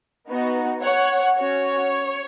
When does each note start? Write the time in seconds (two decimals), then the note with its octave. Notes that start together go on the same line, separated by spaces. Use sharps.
0.28 B3 D#4 F#4
0.83 C#5 F#5
1.38 C#4 F#4 C#5